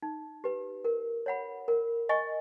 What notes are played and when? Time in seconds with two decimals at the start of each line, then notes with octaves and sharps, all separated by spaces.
0.03 D#4
0.44 G4 B4
0.85 A#4
1.26 C#5 F#5 B5
1.68 A#4
2.09 D#5 G#5 C#6